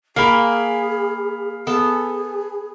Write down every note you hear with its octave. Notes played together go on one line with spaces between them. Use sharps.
A#3 G#4 F5 G5 B5
B3 G#4 A4